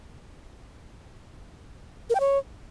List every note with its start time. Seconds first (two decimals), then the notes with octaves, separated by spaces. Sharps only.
2.10 A#4
2.15 G5
2.20 C#5